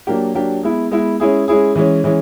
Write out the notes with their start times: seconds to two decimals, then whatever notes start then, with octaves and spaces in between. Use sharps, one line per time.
0.07 F#3 A#3 D4 G4
0.35 F#3 A#3 D4 G4
0.63 G#3 B3 E4
0.91 G#3 B3 E4
1.20 G#3 C#4 E4 G#4
1.48 G#3 C#4 E4 G#4
1.75 E3 G#3 C#4
2.04 E3 G#3 C#4